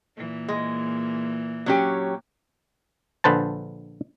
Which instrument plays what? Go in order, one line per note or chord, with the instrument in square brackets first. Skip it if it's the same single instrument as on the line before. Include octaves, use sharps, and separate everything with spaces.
[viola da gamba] A#2 E3 A#3
[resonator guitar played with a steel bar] G#3
F#3 C#4 G4
[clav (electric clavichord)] A#1 D3 B4 C5 A5